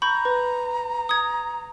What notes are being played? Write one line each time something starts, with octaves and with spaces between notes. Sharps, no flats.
A#5 B5 C#6 G6
B4
D#6 G#6